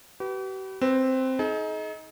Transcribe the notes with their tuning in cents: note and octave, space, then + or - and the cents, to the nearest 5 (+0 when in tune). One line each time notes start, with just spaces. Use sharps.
G4 -45 B4 +0
C4 +0 B4 +20
D#4 +20 G#4 +45